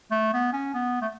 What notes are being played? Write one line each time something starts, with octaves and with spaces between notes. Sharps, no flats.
A3
B3
C#4
B3
A3